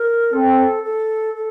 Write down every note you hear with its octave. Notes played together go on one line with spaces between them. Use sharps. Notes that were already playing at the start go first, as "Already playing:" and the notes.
Already playing: A#4
C4 A4
A4
A4